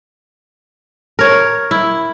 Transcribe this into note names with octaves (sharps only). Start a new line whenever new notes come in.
A#4 C#5
E4